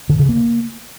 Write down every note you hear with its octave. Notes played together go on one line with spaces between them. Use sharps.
D3
C#3
A#3